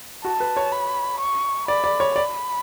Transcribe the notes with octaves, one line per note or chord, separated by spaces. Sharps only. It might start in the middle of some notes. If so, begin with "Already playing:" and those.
F#4 A5
B4
C#5
B5
C#6
D5 B5
D5
C#5
D5 B5